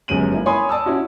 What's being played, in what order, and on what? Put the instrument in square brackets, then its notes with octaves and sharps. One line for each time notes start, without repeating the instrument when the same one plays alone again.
[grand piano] G1 F#2 G#3 C#4 D#7 F#7
A#3 E4
C#5 G#5 B5 C6 D#6
D5 A5 D#6 E6
C#4 E4 F#4